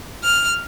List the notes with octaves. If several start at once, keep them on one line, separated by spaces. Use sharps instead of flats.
F6